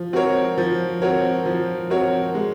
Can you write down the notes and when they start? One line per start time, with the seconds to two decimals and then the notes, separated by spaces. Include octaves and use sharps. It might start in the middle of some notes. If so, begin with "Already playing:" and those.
Already playing: F3
0.13 C4 F#4 A#4 C#5
0.58 F3
1.02 C4 F#4 A#4 C#5
1.46 F3
1.90 C4 F#4 A#4 C#5
2.35 G#3